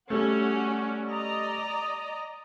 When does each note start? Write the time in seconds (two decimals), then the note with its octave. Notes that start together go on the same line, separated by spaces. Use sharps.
0.10 G3 A3 C#4 F#4 G4
1.06 D5 D#5 A#5